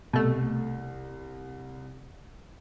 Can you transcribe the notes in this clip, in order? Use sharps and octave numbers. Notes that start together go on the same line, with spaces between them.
C2 B2 A3